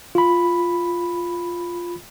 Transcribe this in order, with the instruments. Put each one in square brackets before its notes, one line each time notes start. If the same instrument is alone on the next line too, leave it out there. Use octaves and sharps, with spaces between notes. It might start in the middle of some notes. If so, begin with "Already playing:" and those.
[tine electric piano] F4 B5